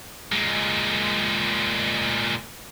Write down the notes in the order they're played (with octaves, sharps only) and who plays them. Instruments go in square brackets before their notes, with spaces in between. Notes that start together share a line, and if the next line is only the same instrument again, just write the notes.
[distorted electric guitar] A#2 G#3